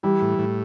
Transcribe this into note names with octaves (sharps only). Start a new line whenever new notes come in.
E3 G3
A2
A2